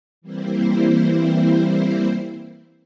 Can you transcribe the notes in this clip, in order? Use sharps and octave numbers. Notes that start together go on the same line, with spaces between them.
E3 G3 A#3 C4 E4 C5